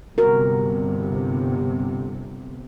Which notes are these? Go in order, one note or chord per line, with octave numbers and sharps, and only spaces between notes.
G1 C3 F#4 A#4